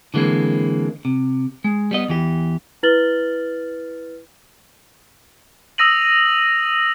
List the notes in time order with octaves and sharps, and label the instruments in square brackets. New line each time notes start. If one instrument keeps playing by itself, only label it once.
[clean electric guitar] D3 E3 G#3 A#3 C4
C3
G#3
G3 B3 D#5
E2 E3 G4
[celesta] E4 B4 F6 A6 F#7 G7
[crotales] D#6 E6 A#6 D#7 F#7